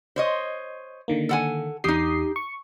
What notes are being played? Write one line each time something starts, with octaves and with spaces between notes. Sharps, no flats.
C5 C#5 D#5
D3 D#3 A#3
A4 F#5 G#5
E2 D#4 G4 D#6 C7
C#6